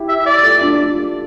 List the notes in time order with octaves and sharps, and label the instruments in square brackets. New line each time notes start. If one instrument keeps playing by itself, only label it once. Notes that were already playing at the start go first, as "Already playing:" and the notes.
Already playing: [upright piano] E4 G4
[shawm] E5
E5
D5
[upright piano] F4 A4
D4 F4